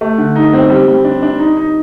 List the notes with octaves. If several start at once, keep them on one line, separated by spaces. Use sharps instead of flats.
A3
D3
D#4
C4
G3
G3
D4
D4
D#4
D#4